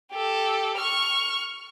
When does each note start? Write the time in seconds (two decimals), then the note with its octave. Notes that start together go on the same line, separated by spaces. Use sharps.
0.12 G4 A4
0.77 C#6 F6